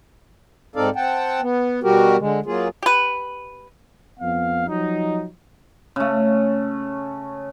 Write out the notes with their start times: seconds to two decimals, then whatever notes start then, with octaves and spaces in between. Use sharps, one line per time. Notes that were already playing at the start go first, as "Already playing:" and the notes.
0.76 G#2 C4 D#4 A4 D5 F5
0.96 C4 F#5 G5 A5
1.41 B3
1.83 B2 G3 F#4 G4 A#4
2.18 D3 G#3
2.46 F#3 A#3 F4 G#4
2.82 G4 B4
4.20 F2 B3 F5
4.67 F3 F#3 D#4
5.96 C#3 A3